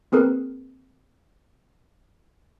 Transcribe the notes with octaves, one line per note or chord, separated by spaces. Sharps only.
A#3 C4 G#4 A#4 B4